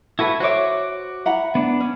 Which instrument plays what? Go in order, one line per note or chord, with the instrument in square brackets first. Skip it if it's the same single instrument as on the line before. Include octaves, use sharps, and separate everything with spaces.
[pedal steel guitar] E4 F#4 B4 [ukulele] A4
[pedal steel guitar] F#4 D6 [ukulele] C5 C#5 E5
[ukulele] E4 F#5 A#5
[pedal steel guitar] B3 D4
[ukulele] C#4